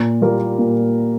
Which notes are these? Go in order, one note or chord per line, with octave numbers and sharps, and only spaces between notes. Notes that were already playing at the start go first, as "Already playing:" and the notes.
Already playing: A#2
G3 A#3 F4 A#4
A#2